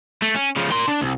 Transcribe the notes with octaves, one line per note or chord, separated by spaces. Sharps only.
A3
C#4
C#3 F3
A#3 C6
D4
C2